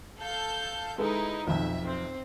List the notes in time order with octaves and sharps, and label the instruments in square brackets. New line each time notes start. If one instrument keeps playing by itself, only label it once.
[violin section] A4 F5 G6
[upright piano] G#3 A4 B4 [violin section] D#4 E4
[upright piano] B1 F2 [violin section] E5
[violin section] C4